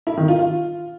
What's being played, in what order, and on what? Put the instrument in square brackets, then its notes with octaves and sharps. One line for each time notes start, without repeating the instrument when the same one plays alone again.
[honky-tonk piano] E4
D#3
F4
F4